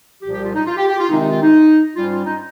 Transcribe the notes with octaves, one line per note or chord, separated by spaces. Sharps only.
C2 A#2 F3 G4
G4
F4
D#4
F4
G4
G4
F4
C3 D#3 G#3 C4 D#4
D#4
F4
D#4
G#2 G3 C#4 F4
F4
D#4